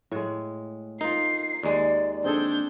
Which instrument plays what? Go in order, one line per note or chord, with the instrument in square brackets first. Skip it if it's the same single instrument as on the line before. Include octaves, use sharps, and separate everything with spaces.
[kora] A2 G#3
[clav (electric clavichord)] D#4 [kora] F4 A#4 [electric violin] C7
[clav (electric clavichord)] D#2 G#3 [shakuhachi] D5
[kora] C4 G#4 A4 [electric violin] D4 G6